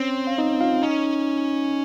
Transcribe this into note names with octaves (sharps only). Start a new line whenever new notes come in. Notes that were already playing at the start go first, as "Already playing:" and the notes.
Already playing: C4 C#4 C#5
F5
D#4 D#5
F4 F5
C#4 D#4 D#5